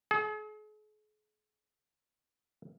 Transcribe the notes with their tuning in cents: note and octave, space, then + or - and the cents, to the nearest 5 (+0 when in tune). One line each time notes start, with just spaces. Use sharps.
G#4 +45